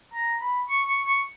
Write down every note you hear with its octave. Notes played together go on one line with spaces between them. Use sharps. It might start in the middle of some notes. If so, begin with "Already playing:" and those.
A#5
B5
C#6
C#6
C#6